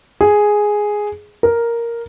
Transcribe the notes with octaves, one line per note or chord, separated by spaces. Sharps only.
G#4
A#4